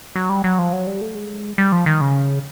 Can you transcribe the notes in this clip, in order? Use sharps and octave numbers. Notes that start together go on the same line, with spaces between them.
F#3
G3
F#3
F3
F#3
G3
A3
G#3
G3
F3
D#3
C#3